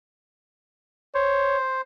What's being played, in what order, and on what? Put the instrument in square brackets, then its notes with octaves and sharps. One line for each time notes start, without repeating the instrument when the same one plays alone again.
[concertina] C5 [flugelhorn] C#5